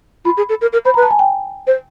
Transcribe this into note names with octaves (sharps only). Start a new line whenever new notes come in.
F4 B5
G#4
A4
A#4
A#4
C5 B5
B4 A#5
A5
G#5
G5
C5